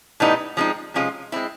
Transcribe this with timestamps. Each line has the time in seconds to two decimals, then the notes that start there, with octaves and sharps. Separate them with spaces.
0.20 A2 E3 G3 B3 D#4
0.57 F3 G#3 C4 D#4
0.94 C3 F3 G#3 C#4 F4
1.32 G#3 C4 E4